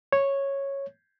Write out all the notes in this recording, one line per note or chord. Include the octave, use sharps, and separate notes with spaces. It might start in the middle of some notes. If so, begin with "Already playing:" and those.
C#5